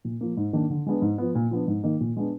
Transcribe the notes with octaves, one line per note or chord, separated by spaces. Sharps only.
A#2
F3 A#3
G#2
D#3 A#3 D4
D3
G#3 B3 D4
G#2
F3 B3
A#2
F3 B3 D4
G#2
D#3 A#3 D#4
A#2
G#3 B3 D4